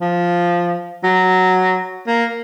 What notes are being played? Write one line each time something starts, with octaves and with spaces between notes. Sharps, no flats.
F3
F#3
A#3